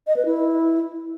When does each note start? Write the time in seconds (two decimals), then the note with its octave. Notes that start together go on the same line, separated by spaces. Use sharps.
0.07 D#5
0.16 B4
0.26 E4